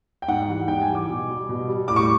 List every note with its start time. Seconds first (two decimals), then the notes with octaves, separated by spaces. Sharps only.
0.22 G5
0.28 G#2 F#5
0.48 E3 G3
0.68 G#2 G5
0.82 G#5
0.88 E3 G3
0.95 D6
1.08 B2
1.29 G3
1.49 B2
1.68 G3
1.88 A2 D6
1.96 C#6